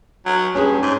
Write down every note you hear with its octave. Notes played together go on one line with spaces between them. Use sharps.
F#3
G2 C#4 G#4
G#2